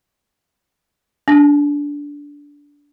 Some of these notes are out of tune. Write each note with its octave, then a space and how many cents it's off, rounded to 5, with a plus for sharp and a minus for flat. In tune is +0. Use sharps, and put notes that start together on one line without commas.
D4 -15